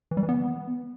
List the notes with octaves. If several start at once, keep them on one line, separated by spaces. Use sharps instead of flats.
E3
G3
E3
B3